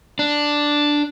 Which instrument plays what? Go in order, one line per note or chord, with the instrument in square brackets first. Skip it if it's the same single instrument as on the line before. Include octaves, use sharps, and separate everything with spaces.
[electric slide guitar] D4